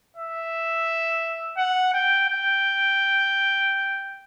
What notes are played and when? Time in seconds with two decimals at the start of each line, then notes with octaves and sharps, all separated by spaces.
0.17 E5
1.57 F#5
1.93 G5
2.28 G5